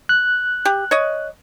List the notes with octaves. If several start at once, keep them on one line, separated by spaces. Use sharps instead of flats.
F#6
G4
C#5 D#5